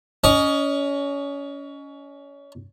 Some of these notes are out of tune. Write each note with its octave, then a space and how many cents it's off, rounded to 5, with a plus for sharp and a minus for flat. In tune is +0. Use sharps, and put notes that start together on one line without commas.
C#4 +25 D#5 -10